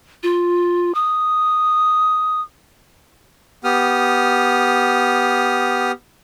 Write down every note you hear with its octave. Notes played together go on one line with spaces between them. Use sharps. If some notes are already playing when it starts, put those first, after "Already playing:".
F4
D#6
B3 G4 D#6 F6